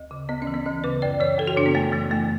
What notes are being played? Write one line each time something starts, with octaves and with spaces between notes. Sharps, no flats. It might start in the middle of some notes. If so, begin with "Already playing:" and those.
Already playing: D2
C#3
D2 B3
C#4
E3
B3
D2 C#4
C#3 B4
F#2 D5
E3 C#5
F#2 A4
F#4
C#3 D4
B3
F#2 A3
E3 A3
F#2 A3